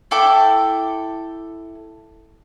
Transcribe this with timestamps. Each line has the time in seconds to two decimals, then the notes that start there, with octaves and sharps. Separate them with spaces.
0.11 E4 A4 G5 D6